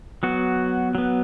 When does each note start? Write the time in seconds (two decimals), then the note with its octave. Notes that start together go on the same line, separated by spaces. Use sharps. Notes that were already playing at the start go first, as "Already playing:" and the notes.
0.23 F#3 B3 F#4
0.95 F#3 B3